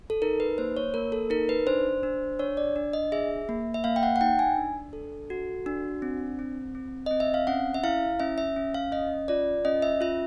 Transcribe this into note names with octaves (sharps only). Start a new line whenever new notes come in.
A4
D#4 A#4
B4
A#3 C5
C#5
A#3 A#4
A4
D#4 A#4
B4
D4 C5
D4
D4 C#5
D5
D4
D#5
G#4 E5
A#3
E5
A#3 F5
G5
F#5
F#5
D#4 G5
G#5
D4
A4
F#4
D4
C4
C4
C4
C4 D#5
E5
F5
C#4 F#5
E5
E4 F5
C#4 E5
E5
C#4
F5
C#4 D#5
F4 D5
C#4 D#5
E5
F4 E5